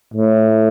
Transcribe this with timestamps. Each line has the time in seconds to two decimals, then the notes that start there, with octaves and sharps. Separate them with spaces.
0.14 A2